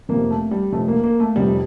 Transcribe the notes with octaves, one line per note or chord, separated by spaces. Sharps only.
F1 F2 C3 A#3
A3
G3
F1 F2 C3 A3
A#3
A#3
A3
F1 F2 C3 G3